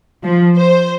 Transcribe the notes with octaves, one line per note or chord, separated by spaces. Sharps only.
F3
C5